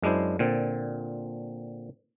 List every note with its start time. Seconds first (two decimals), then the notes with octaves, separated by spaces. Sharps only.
0.02 F#2 G#3 D4 E4 C5
0.39 A#2 D3 C4